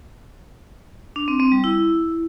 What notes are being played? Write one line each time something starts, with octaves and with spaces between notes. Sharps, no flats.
D4
C4
C4
G3
E4